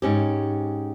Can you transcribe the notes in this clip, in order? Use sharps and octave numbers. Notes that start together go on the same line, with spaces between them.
G#2 C#4 G4